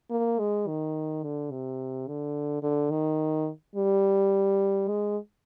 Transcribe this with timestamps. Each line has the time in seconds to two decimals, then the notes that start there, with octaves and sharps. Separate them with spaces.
0.11 A#3
0.39 G#3
0.67 D#3
1.24 D3
1.51 C3
2.07 D3
2.63 D3
2.91 D#3
3.76 G3
4.88 G#3